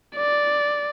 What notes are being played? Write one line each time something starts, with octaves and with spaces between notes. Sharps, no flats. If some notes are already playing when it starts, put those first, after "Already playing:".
D5